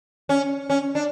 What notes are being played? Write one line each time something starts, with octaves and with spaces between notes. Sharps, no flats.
C#4
C#4
D4